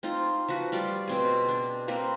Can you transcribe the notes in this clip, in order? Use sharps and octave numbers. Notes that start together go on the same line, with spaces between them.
C4 D#4 F4 C6
F3 F#4 B4
G3 F4 D5 D6
B2 C4 G#4
D4
A#3 C4 A#4 B4